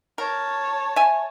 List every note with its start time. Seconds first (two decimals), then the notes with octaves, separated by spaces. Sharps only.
0.18 A#4 C#5 A5
0.96 E5 G#5